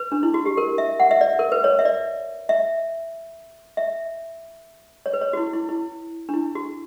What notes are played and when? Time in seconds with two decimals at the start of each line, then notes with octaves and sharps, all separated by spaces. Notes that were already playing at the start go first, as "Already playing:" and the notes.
Already playing: B4
0.12 D4
0.23 E4
0.34 F#4
0.46 G4
0.57 A#4
0.78 E5
1.00 F#5
1.11 E5
1.21 D5
1.39 A#4
1.52 B4
1.64 C#5
1.79 E5
1.85 D5
2.49 E5
3.77 E5
5.06 C#5
5.13 B4
5.21 C#5
5.33 F#4
5.37 E4
5.53 E4
5.69 E4
6.29 D4
6.34 E4
6.55 F#4